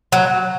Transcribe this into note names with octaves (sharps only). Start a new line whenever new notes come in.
F#3